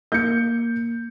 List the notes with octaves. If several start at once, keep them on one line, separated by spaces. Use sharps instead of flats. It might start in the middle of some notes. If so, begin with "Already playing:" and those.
A#3 G6 C#7